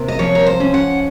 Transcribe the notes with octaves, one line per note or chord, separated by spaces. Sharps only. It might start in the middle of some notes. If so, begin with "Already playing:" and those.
Already playing: C3 A#3
D#5
F3 C#5
A#4
C5
C#4
F#5